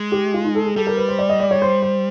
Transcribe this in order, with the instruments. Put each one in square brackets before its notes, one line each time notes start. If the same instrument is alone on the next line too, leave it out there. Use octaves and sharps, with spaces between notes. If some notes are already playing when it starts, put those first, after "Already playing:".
Already playing: [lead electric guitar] G#3
[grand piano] G4
F4
D#4
A4
G#4
[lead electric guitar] G3 [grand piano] A4
[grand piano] A#4
B4
C5
D5
D#5
D5
C#5
C5
C5